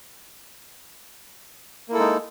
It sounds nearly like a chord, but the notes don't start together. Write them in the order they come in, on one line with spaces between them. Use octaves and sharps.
A#3 E4 A4 G#3 D#4